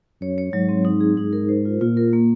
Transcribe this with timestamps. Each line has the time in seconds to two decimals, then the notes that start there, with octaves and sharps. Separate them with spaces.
0.21 F#2 C#5
0.38 C#5
0.53 G#2 F#3
0.69 C4
0.85 D#4
1.00 G#4
1.17 G#2 D#4
1.33 A#4
1.49 C5
1.65 F4
1.81 A#2 F4
1.97 A#4
2.13 A#3